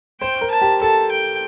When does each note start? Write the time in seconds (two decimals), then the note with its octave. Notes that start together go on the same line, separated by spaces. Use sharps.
0.21 C5 G5
0.41 A#4
0.51 A5
0.62 G4
0.81 A4 A5
1.12 G5